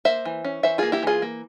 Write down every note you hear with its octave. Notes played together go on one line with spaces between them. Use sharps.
A#3 C5 E5
E3
C#4
E3 C5 E5
A#3 F4 G#4
E4 G4
E3 F4 G#4
A#3